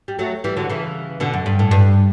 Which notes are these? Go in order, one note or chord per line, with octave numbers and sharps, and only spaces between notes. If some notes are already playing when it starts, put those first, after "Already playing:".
G3
F#3 A3
E3 G3
D3 F#3
C#3 E3
B2 D3
F#2
G2
A2
G2